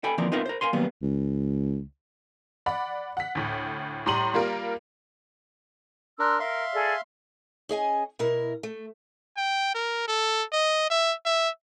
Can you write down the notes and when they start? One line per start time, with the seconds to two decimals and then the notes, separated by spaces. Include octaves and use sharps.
0.04 A4 G5 G#5 B5
0.18 D#2 E3 F3 C4 A#4 D5
0.32 B3 C4 D#4 F4 A#4 E5
0.46 A#4 C5
0.61 A#4 F5 G#5 C6
0.73 D#3 F#3 G3 A#3 B3
1.02 C#2
2.66 D5 F#5 B5
3.17 F#5 B6
3.35 D2 A2
4.06 A2 G3 A#5 C6 D#7 F#7
4.34 G3 A#3 F4 A#4
6.19 D4 A#4 C6 E6 F#6
6.40 A#4 E5 F5 C6
6.73 G#4 A4 D5
7.69 C#4 G#4 D#5 G#5
8.19 B2 E4 A#4
8.63 A3
9.37 G5
9.74 A#4
10.08 A4
10.52 D#5
10.90 E5
11.25 E5